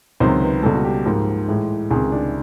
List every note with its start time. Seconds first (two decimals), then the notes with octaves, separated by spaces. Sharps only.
0.20 C#2 C3 D#3 F#3 C5
0.42 B4
0.63 C#2 B2 G3 A4
0.75 F#4
0.84 G4
1.05 G#2 F3 A#3
1.48 A2 E3 G#3
1.91 C#2 C3 D#3 G#4
2.12 D4